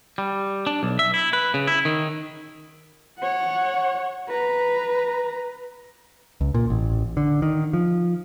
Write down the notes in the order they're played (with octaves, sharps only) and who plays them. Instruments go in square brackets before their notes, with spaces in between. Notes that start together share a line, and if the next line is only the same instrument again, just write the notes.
[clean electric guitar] G3
D4
B1
E5
E4
B4
C#3
E4
D#3
[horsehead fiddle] C#5 F#5
B4 A#5
[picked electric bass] C#2
A#2
A1
D3
D#3
F3